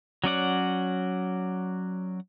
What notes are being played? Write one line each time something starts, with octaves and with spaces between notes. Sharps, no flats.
F#3 C#4 D5 F#5